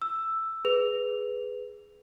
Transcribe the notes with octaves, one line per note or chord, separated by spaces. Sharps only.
E6
G#4 B4 F7